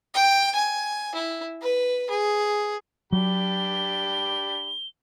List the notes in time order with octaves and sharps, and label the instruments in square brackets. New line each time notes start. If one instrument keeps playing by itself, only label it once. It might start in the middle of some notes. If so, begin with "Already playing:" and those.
[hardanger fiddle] G5
G#5
E4
B4
G#4
[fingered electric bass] F#3 [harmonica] D4 G4 B5 [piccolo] G7